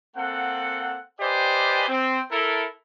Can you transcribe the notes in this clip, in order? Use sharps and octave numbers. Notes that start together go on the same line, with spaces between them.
A#3 C4 A4 F#5
G4 B4 C5 D5 D#5 G#5
C4
E4 A4 A#4